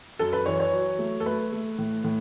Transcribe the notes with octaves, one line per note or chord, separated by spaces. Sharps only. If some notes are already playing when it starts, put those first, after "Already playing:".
F#2 A4
B4
E3 C#5
C#5
F#3
A3
A4
A3 B4
A3
A2
A2